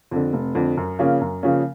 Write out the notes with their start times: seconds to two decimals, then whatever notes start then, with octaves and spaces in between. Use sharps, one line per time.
0.11 F2 D3
0.33 F1
0.55 F2 D3
0.77 F#2
0.99 C#3 F3 A#3 C#4
1.21 F#2
1.43 C#3 F3 A#3 C#4